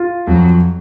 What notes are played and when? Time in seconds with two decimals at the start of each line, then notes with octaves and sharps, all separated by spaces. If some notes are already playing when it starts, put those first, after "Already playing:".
Already playing: F4
0.27 F2 F#3